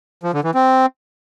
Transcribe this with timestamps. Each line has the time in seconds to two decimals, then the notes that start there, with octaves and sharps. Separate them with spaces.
0.23 F3
0.34 D3
0.44 E3
0.55 C4